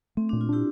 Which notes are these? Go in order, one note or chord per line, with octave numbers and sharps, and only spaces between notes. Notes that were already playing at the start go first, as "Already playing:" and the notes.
A3 C4
A#2 D4
F4
D4 E4 G4